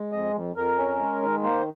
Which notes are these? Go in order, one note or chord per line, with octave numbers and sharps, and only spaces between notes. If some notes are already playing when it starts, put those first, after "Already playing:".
Already playing: G#3
F2 D#5
F2
F2 A#4
C#4
G#3
D#3
A#3 C5